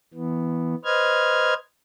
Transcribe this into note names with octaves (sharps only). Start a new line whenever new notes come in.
E3 B3
B4 C5 D#5 F6 G#6